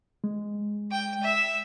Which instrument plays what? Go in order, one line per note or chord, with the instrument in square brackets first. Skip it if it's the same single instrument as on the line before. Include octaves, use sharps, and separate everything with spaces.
[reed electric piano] G#3
[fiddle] G5
E5 E6